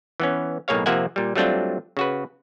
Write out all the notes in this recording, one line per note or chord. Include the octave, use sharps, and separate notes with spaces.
E3 B3 C#4
B1 A2 A#3 G#4 C#5 F5
C3 F3 A#3 E5 F#5 G#5
A#2 G3
F#3 G3 A3 C4 D4 F4
C#3 F#4 B4